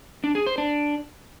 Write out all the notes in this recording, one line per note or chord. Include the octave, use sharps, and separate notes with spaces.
D4
G#4
C5
D4